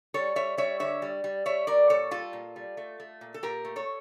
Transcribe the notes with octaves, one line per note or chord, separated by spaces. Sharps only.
G3 A4 C#5
G3 C#5 E5
G3 C#5 E5
D3 C#5 E5
G3
G3
G3 C#5 E5
G3 A#4 D5
A#2 A4 C#5
G3 F4 A4
A#2
G3
A3
A3
A#2
A4
A#2 G4 A#4
A3
A4 C#5